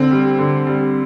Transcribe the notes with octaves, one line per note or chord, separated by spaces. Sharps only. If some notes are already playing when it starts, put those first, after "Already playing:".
Already playing: D3 C4
G3
D3
G3